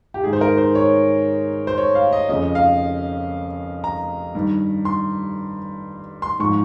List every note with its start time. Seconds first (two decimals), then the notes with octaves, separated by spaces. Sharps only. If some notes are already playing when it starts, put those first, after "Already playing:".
0.14 G4
0.23 G#2 D#3 G#4
0.33 C5
0.41 A#4
0.57 C5
0.75 C#5
1.67 C5
1.78 C#5
1.95 F5
2.13 D#5
2.29 F2 C#3 F3 D#5
2.55 F5
3.84 A#5
4.35 G2 D#3
4.85 C6
6.22 C6
6.39 G#2 F3 C#6